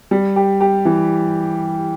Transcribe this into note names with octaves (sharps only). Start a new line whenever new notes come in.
G3
G4
G4
E3